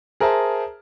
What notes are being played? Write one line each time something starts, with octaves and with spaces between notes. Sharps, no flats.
G#4 A#4 C5 E5 A5